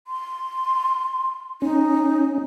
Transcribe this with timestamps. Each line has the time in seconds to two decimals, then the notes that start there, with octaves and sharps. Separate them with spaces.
0.07 C6
1.62 C#4 D#4